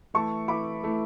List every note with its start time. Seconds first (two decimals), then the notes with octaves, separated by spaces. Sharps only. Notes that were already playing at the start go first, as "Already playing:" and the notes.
0.14 E3 A3 E4 A5 C#6
0.48 E3 A3 E4 B5 D6
0.83 E3 A3 E4